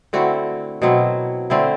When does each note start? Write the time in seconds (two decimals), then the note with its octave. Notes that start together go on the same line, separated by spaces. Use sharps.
0.13 D3 A3 C4 E4 F#4
0.82 B2 F#3 C4 E4
1.50 D3 A3 C4 E4